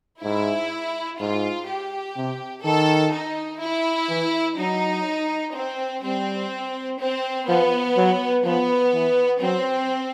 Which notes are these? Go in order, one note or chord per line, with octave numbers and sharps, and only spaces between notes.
G#2 E4
G#2 F4
G4
C3
D#3 A4
D#4
E4
E3
F#3 D#4
C4
G3 C4
C4
F3 B3
F#3
F3 B3
E3
F#3 C4